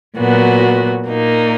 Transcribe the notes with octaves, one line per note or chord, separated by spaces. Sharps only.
A#2 F#3 B3 F#4
A#2 A#3 D#4